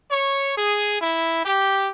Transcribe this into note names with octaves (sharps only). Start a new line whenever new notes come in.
C#5
G#4
E4
G4